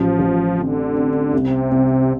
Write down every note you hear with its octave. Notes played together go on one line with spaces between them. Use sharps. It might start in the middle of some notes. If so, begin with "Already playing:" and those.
Already playing: A1 F3
A1
D3 C4
C4
C2 C3
C2